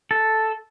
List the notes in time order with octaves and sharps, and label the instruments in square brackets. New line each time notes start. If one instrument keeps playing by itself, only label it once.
[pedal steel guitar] A4